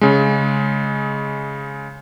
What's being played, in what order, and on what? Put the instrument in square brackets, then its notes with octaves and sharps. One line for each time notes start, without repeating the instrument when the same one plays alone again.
[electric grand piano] C#3 G#3